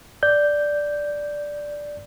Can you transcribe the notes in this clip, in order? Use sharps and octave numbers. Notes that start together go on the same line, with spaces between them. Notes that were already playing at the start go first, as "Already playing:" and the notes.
D5 G6